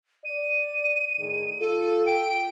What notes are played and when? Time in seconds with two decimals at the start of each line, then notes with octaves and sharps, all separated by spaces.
0.25 D5 D#7
1.19 A2 D#3 G#4
1.60 F4 A4
2.06 G5 D7